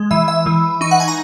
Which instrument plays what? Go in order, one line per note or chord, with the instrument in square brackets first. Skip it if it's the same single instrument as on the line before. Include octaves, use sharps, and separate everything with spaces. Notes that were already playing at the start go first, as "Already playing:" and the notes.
Already playing: [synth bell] G#3
E3 E5
E5
E3
D#4 C#6
F#5
G#5
A#5